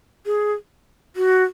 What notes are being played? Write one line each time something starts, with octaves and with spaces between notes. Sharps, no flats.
G#4
F#4